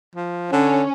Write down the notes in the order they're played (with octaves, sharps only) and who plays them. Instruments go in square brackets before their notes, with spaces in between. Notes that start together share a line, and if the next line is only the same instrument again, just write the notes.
[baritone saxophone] F3
[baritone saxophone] D3 [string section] C#4